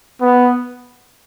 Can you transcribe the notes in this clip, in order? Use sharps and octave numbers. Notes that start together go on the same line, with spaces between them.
B3